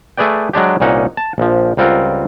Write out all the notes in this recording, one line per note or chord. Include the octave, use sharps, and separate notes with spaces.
A3 G#4 B4 D5 G5
F#3 G#3 D4 G4
C2 A#2 C#4 D#4 F#5
A5
A#1 F3
C#2 G3 C4 F4 A#4 F#5